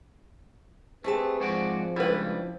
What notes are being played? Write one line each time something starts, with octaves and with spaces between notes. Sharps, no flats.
A3 C4 G4 G#4 B4 A5
G#2 F3 F#4 D5
C#2 G2 G3 E4 B4